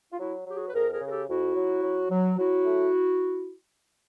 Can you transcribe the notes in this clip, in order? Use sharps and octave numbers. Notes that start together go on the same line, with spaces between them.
F4
F#3 E4 F#4
F#3 G4
F#4 G#4
B4
F2 G#4 A#4
G#4 A#4
C#3
A#4
G4 A4
F2 E4 F#4
F#3
F#3
F#3
F#3 E4 F#4
A3